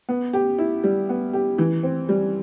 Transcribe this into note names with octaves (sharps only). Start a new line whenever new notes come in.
B3
G4
E4
G3
B3
G4
E3
C4
G3